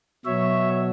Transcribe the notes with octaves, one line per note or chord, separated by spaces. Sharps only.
B2 F#3 C#5 E5